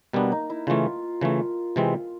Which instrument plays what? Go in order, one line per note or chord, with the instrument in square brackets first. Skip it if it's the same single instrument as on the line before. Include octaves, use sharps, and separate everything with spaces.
[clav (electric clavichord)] B2 G3 B3 D4 [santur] A#3
[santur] D#4
E4
[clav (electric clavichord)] C#3 E3 A3 [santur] F4
[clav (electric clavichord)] C#3 E3 A3
C3 E3 G#3 C4